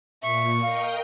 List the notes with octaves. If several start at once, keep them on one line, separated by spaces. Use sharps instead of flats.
A#2 E5 C#6
A#4 D#5 F5 G5